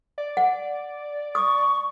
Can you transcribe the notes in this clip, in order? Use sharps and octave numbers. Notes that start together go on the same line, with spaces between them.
D5
F#5
C#6 D#6